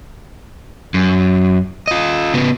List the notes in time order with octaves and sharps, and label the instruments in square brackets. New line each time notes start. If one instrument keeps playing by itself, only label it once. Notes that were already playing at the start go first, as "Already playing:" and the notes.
[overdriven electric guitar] F#2
F4 D#5
C#3 B3